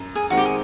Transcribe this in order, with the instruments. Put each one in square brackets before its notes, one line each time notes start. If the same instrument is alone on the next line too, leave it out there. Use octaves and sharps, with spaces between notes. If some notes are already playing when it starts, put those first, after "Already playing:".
Already playing: [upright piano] F#2
[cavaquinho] G#4
[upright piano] D#3 G#3 C4 [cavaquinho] F#4
[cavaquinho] G4
G#4